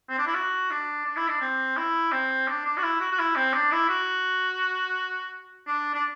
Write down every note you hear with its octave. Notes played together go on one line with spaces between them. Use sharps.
C4
D4
E4
F#4
D4
D4
E4
D4
C4
E4
C4
D4
D4
F#4
E4
F#4
F#4
E4
C4
D4
E4
F#4
D4
D4